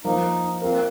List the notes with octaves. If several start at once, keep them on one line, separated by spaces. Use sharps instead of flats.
F3 A#3 D#4 F4 A#4
A#3 C4 F4 A#4